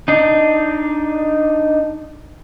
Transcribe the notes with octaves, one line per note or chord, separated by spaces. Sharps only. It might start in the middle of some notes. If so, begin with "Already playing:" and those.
D4 D#4